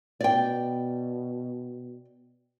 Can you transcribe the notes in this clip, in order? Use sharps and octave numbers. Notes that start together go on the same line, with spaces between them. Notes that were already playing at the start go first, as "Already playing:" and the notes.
B2 D5 G5